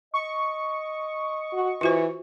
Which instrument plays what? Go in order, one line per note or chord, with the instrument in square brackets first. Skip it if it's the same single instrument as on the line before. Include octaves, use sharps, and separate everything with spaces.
[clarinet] D#5 [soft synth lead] C#6
[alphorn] F#4
[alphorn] E3 [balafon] F4 F#4 C5